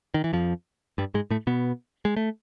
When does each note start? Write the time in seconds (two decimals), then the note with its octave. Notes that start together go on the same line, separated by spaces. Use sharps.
0.14 D#3
0.24 E3
0.33 F2 F3
0.98 G2 G3
1.14 G#2 G#3
1.30 A2 A3
1.47 B2 B3
2.05 G#3
2.16 A3